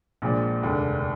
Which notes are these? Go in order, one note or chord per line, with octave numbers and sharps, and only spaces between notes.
A#1 A#2 F3 G#3 D4
F1 D#2 D3 G#3 D4